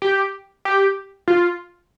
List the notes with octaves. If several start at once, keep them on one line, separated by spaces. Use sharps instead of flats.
G4
G4
F4